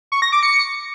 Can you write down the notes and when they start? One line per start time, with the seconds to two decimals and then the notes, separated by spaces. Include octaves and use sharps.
0.12 C#6
0.22 A#6
0.32 D6
0.43 C#7